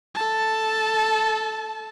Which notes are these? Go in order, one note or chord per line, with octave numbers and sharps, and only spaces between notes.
A4 A5